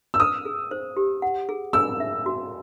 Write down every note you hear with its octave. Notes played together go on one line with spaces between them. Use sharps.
E6
B4 D#6
G#4
C5
G4
F#5
G#4
G#4 E6
E5
F#4